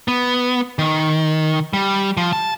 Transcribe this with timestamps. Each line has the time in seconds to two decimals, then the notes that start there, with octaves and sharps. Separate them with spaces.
0.08 B3
0.79 D#3
1.73 G3
2.17 F3
2.33 A5